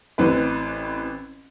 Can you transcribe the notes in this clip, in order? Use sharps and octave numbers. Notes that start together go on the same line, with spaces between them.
A1 E3 C4 B4